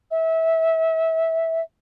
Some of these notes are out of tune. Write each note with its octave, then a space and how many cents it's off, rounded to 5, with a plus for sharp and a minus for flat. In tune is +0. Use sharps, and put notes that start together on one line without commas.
E5 -20